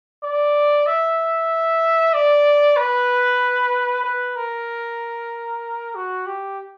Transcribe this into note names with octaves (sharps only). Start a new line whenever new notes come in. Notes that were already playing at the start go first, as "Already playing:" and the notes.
D5
E5
D5
B4
B4
A#4
F#4
G4